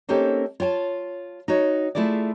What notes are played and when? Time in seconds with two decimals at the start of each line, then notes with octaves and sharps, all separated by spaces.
0.09 A#3 C4 C#4 D#4 G4 A4
0.60 F4 C#5 G5 A5
1.48 D#4 F#4 C#5
1.95 A3 E4 F4 G#4 D5